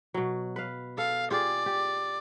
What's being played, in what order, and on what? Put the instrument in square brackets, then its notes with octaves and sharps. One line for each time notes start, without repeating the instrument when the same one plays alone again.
[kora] B2 F#3
B4 F5
[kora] A4 [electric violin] F5
[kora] F4 G4 G#4 [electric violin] D5
[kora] G4